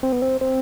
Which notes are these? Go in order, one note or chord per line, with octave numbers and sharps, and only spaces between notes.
C4
B3
C4
C4